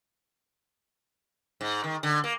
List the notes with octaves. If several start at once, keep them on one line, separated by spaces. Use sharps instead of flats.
G#2
D#3
D3
A#3